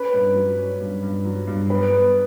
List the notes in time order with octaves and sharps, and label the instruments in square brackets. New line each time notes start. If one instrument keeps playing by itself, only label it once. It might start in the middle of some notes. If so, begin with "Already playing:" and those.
Already playing: [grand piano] C#4 [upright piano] B4
[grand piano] G2
F#3
C#4
G2
G2
F#3
G2
[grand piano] B3 [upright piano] B4
[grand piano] B3